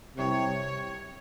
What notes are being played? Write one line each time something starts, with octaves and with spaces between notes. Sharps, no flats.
C2 C3 C#5